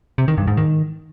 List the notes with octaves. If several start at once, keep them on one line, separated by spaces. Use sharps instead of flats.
C3
D#3
G2
G#2
D#3